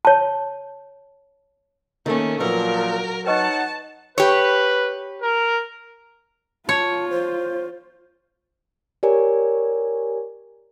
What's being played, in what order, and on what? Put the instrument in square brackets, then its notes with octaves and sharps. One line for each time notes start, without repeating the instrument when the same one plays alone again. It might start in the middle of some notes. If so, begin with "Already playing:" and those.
[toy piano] C#5 A5
[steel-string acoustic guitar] D#3 A#3 [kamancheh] A3 C#4
[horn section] A#2 F3 [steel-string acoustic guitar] F#3 [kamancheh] A#4 [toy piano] B4
[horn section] D#4 C#5 F#5 [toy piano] B4 D#5 C#6 [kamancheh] A5
[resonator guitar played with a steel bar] G4 C#5 [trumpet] B4
[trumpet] A#4
[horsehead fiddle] F4 [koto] C#5 [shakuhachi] A5
[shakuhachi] C5
[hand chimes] G4 A#4 C#5 D5 G#5